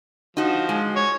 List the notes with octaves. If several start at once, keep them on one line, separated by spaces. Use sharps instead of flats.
F3 D#4 F#4
G#3
C#5